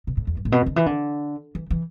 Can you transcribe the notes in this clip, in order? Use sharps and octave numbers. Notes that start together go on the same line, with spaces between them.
B2
A2
E2
G2
A2
B2
D3
E3
D3
E3
E3